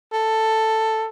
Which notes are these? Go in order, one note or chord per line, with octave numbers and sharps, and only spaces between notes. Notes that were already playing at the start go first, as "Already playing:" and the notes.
A4